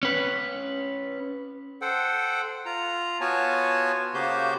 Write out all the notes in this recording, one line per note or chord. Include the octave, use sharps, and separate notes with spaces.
C#4 B4
A4 C5 F#5 G5
F4 A#5
B3 F4 F#4 C#5 G#5 A5
C#3 A#3 F#4 G4 C5 G6